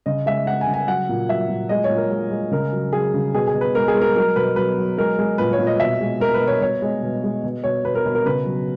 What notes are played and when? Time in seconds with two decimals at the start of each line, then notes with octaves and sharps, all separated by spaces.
0.06 C#3 D#5
0.26 G#3 E5
0.46 G#3 F#5
0.61 G#5
0.67 C#3
0.74 G#5
0.88 F#3 F#5
1.09 A#2
1.29 F#3 E5
1.49 A#2
1.69 G#3 D#5
1.84 C#5
1.90 A#2
1.97 A#4
2.11 G#3
2.31 G#3
2.51 C#3 A#4
2.72 F#3
2.93 F#3 G#4
3.14 C#3
3.34 B2 G#4
3.47 G#4
3.54 B2
3.61 B4
3.75 G#3 A#4
3.88 G#4
3.95 G#3
4.01 A#4
4.16 F#3 A#4
4.36 B2 B4
4.56 F#3 B4
4.77 F#3
4.98 G#3 A#4
5.19 G#3
5.38 A#2 B4
5.53 C#5
5.59 A#2
5.67 D#5
5.80 B2 E5
6.01 G#3
6.20 G#3 A#4
6.34 B4
6.41 B2
6.47 C#5
6.61 B2 C#5
6.82 G#3
7.03 B2
7.24 G#3
7.44 B2
7.64 B2 C#5
7.85 B2 B4
7.95 A#4
8.05 B2 B4
8.15 A#4
8.25 C#3 B4
8.46 F#3